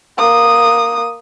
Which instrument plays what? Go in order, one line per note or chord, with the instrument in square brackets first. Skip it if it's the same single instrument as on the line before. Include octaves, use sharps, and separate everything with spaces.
[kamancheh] A#3 D#6